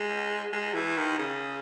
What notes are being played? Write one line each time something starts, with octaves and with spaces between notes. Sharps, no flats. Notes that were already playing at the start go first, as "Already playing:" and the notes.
Already playing: G#3
G#3
E3
D#3
C#3